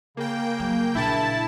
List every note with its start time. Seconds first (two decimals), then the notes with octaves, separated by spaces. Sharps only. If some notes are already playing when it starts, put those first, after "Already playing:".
0.17 C#3 A#3 G5
0.59 F#3
0.95 A#1 E4 A5